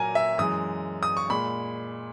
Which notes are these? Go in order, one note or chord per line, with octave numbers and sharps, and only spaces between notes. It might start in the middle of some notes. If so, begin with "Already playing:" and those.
Already playing: A#2 F#3 A#3 G#5 A#5
E5
F#2 E3 G#3 D#6
D#6
C#6
A#2 G#3 B5